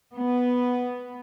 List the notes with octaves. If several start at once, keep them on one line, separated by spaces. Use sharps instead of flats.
B3